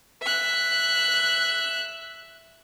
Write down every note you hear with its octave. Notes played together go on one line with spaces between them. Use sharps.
E5 F#6